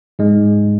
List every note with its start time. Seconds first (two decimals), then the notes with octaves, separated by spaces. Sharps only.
0.19 G#2 G#3